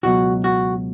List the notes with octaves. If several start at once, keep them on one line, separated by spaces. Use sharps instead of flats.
C#2 B2 F#3 F#4
F#4